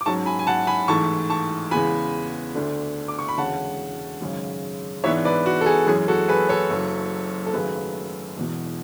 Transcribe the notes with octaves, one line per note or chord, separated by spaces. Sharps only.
D6
G#2 F#3 C#4 A5 C#6
G#5 B5
G#5
F#5 A5
G#5 B5
A1 G#2 E3 A3 A5 C#6
A5 C#6
E2 C#3 G#3 B3 G#5 B5
D2 D3 A3 D4
D6
C#6
B5
E1 D2 C#3 G#3 C#4 F#5 A5
G#1 F#2 C#3 G#3 C#4
G#2 E3 B3 D4 C#5 E5
B4 D5
F#4
A4
G#4
F#2 E3 G#3 C#4 G#4
F#4 A4
G#4 B4
A4 C#5
F#1 F#2 C#3 F#3
A4
G#1 F#2 C#3 F#3 A3 G#4 B4
E1 E2 B2